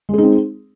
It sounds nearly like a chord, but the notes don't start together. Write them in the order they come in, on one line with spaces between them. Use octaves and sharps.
G#3 G#4 D#4 C4